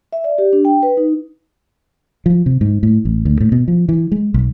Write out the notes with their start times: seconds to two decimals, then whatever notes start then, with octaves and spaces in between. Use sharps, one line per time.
0.13 E5
0.24 D5
0.38 G4
0.53 D4
0.65 G5
0.83 B4
0.97 D#4
2.26 F3
2.46 C3
2.61 G#2
2.83 A2
3.05 A1
3.25 D2
3.40 A2
3.52 B2
3.68 F3
3.89 E3
4.12 G#3
4.34 B1